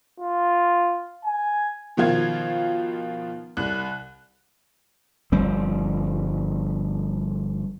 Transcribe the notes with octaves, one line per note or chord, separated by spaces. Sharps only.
F4
G#5
B2 D#3 F3 F4 G#6
C2 F#6
G1 F3 G3 C4